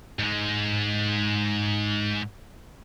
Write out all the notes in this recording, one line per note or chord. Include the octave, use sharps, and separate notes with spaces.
G#2 G#3